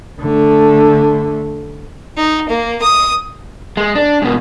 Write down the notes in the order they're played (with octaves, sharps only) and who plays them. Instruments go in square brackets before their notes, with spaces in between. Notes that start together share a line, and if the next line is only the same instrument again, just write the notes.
[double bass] D3 A3
[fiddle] D#4
A#3
D#6
[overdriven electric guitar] G#3
D4
G#2 B2